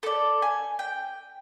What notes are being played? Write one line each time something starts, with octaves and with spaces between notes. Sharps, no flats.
A4 D5
G#5
G5